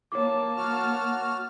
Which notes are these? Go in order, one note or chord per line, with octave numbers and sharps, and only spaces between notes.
A#3 C#5 A5 D6
F#4 F6